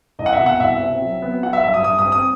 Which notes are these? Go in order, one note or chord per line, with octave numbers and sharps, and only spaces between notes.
C2 D#5
F#5
E5
B2
F#5
C2 E5
C4
F#3
B3
F#3 F#5
E5
G2 E5
D#6
G2 D#6
D#6
C4
D#6